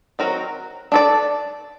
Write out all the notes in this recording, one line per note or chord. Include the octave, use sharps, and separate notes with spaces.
D#3 F#3 C4 F#4 A#4
D4 A4 D5